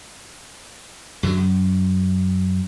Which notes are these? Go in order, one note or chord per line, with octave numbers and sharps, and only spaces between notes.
F#2 D3 F3 F#3
F#2